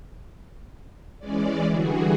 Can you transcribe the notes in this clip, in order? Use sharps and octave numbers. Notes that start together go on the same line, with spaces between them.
E3 G#3 C#4 D5
D3 E3 G3 F#4 G#4